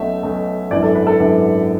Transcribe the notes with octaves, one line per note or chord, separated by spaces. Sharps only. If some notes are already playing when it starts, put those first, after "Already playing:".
Already playing: B1 B2 A3 C#4 E5
B1 B2 A3 C#4
G#1 F#2 E3 B3 D4 D5
A4
B4
A4
G#1 F#2 E3 B3 D4